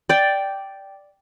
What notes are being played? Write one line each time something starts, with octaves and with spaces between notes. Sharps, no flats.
D5 G5